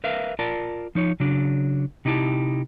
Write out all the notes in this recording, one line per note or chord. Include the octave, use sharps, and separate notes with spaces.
A#4 B4 E5 F5
F4 A#4 D5 A5
F3 D#4 C#5
C#3 F#3 D4
C3 D#4 E4 G4 A5